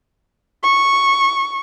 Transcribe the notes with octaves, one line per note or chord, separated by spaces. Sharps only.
C#6